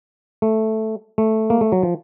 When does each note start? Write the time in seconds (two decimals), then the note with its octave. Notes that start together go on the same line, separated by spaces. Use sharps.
0.42 A3
1.18 A3
1.50 A#3
1.61 A3
1.72 F#3
1.83 F3